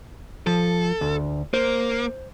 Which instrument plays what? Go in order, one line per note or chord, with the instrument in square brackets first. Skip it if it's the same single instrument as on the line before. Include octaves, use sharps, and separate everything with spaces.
[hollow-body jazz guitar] F3 [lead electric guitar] A4
[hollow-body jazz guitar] D2
[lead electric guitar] A#3 [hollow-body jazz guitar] C5